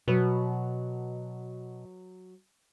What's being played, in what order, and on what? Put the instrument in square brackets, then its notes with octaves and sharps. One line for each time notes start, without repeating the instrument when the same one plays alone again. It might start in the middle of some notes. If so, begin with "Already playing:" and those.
[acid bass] B2 [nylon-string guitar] F#3 B4